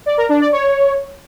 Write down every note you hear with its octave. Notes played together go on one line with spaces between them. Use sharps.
D5
A#4
D4
D5
C#5